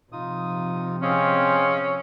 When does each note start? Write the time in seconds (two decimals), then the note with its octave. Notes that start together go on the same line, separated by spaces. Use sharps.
0.12 C3 F3 D#4 F4 D#6
1.02 C4 C#4 G#4 D#5 F5